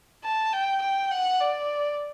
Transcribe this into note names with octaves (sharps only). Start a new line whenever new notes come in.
A5
G5
G5
F#5
D5